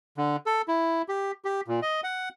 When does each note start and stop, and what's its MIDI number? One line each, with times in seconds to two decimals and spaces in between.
0.18 0.37 50
0.46 0.62 69
0.68 1.02 64
1.08 1.32 67
1.45 1.61 67
1.68 1.80 46
1.82 2.01 75
2.04 2.29 78